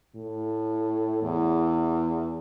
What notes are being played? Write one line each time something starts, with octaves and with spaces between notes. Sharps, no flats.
A2
E2